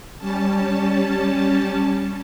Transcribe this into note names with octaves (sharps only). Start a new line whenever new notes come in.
G3 C#4 A5